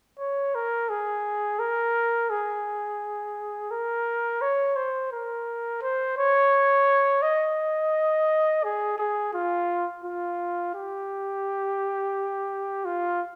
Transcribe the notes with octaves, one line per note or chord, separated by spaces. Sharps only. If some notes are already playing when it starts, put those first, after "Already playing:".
C#5
A#4
G#4
A#4
G#4
A#4
C#5
C5
A#4
C5
C#5
D#5
G#4
G#4
F4
F4
G4
F4